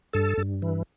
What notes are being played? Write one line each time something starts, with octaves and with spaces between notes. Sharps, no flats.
G2 A4
G2
E3